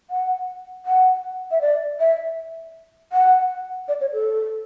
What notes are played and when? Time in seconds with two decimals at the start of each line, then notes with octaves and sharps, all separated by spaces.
0.10 F#5
0.86 F#5
1.51 E5
1.61 D5
2.00 E5
3.12 F#5
3.88 D5
4.01 C#5
4.13 A4